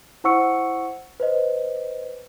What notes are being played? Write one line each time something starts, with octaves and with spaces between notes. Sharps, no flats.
E4 C5 F#5 C#6 E6 C#7
B4 C5 D#5